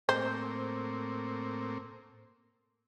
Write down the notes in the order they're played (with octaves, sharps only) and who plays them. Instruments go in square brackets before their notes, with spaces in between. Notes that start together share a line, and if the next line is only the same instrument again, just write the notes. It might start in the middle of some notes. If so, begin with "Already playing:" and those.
[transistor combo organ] A2 A#3 C4 [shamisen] C5